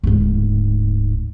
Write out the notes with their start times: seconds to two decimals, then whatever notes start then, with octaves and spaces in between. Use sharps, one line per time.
0.04 D1 G#2